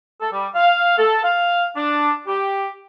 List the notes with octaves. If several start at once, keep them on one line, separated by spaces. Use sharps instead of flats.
A4
G3
F5
A4
F5
D4
G4